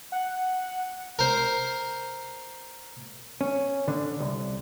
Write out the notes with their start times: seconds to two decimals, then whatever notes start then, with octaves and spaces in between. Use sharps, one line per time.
0.12 F#5
1.19 A#4 C5
3.41 C#4
3.88 D3
4.20 C2